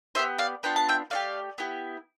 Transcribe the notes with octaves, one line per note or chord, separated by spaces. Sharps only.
B3 D4 G4 C5 E5
D5 F5
B3 D4 F4 G5
A5
E5 G5
A3 D4 G4 D5 F5
B3 E4 G4